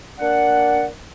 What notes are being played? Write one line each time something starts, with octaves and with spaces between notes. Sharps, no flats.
A#3 D4 D5 F#5